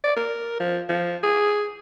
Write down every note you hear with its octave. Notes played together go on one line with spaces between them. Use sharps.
D5
A#4
F3
F3
G#4